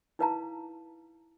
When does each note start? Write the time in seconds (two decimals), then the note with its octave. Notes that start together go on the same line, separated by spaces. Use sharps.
0.19 D#4 E4 B4 F5 A5 A#5